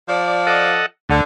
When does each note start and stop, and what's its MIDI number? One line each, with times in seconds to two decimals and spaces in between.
0.08 0.78 53
0.08 0.78 74
0.47 0.86 69
0.47 0.86 75
0.47 0.86 78
1.09 1.21 38
1.09 1.22 50